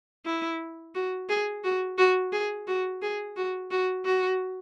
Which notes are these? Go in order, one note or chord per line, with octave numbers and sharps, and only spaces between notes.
E4
F#4
G#4
F#4
F#4
G#4
F#4
G#4
F#4
F#4
F#4